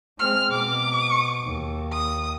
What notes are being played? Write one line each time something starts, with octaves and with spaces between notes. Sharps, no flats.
G#3 C4 F6
B2 D6
D#2
D#6